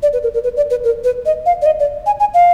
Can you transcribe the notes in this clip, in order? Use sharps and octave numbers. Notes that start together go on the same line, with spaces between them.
D5
B4
A#4
A#4
B4
D5
B4
A#4
B4
D#5
F5
D5
D#5
D5
G#5
G#5
F5